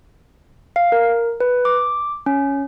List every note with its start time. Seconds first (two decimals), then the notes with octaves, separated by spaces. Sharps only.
0.76 F5
0.92 A#4
1.40 B4
1.65 D6
2.26 C#4